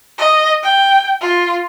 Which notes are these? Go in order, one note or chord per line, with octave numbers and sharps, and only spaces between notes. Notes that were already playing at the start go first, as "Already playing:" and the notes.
D#5
G5
F4